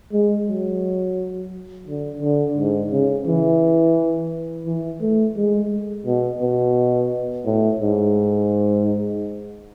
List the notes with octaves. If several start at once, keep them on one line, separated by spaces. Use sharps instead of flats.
G#3
F#3
D3
D3
G#2
C#3
E3
E3
A3
G#3
B2
B2
A2
G#2